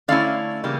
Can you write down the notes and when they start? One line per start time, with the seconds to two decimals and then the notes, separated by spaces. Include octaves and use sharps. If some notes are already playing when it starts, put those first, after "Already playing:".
0.08 D3 A3 C#4 E4 D5 F5
0.64 C#3 E3 G3 A#3